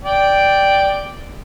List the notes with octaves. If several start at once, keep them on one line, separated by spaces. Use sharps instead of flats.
D5 G5